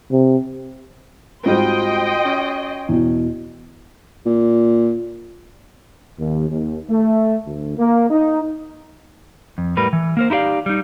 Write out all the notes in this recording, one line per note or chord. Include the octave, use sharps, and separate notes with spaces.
C3
G#2 G3 C4 F4 F#4 D#5 G5 C6
C#4
E2 B2
A#2
D#2
D#2
A3
D2
A#3
D#4
F2
A2 G3 A#4 B4
E3
A#3 A#4 C5
D#4 E4 G4 D5 F5
G3 D#4